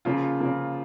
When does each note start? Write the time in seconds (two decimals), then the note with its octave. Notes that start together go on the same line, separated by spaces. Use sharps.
0.05 C#3 F3 A#3 F4
0.41 C#3 F3 A#3